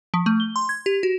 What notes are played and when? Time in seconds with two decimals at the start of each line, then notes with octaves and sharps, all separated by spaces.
0.14 F3
0.26 A3
0.40 G7
0.56 C6
0.69 G#6
0.86 G4
1.03 F#4